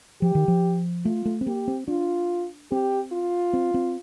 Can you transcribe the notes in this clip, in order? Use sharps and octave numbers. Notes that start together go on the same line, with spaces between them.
F3 G4
D#3
F3
A3 F4
A3
C4
A#3 G4
C4
D4 F4
C4 G4
F4
C4
C4